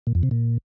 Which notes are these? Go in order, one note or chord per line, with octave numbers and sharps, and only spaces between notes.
A#2
F2
C3
A#2